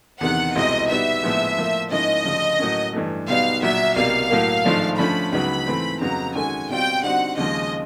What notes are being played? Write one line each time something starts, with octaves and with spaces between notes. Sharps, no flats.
E2 C3 D#3 F#5
C2 B2 G#3 C4 E4 D#5
B2 G3 B3 D#4 E5
A#1 A2 F3 G#3 B3
A2 F3 A#3
G#2 F3 A#3 C#4 E4 D#5
D2 C#3 F3
A2 F#3 A#3 C#4
G2 E3 A3
B1 B2 G3 B3 D#4 F5
A#1 A#2 F#3 E5
C2 B2 G3 A#3 F5
A2 F#3 A#3
G#1 G#2 F3 A3 D4
D3 F3 A3 C#4 B5
C#2 C#3 F#3 B3 D#4 B5
G#2 E3 A3 C4
F2 C#3 F#3 B3 A#5
D#3 G#3 C#4 F#4 A4 G#5
B2 G3 C4 F4 G5
D3 G3 C4 D#4 F#4 F#5
D#2 C#3 F3 G#3 D#5